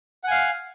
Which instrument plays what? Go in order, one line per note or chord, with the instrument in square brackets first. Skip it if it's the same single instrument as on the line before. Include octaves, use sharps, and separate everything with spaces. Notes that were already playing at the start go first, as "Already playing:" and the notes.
[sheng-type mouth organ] F#5
G#5
F5